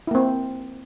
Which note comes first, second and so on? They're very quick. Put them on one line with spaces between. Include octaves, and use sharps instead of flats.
E4 A#3 C4